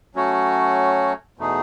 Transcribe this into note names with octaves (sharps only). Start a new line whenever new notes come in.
F#3 A3 C#4 F#4 C#5
E2 B2 A3 D#4 G#4